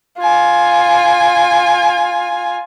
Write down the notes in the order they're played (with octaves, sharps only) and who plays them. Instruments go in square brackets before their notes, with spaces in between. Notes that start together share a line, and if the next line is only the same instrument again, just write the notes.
[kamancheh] F4 G#5